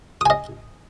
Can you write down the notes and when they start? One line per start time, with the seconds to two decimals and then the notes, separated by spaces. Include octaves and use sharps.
0.21 D#6
0.26 G#5
0.30 D#5